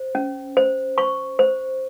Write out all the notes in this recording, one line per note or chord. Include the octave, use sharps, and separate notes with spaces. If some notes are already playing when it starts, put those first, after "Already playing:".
Already playing: C5
C#4
C5
C5 C#6
C5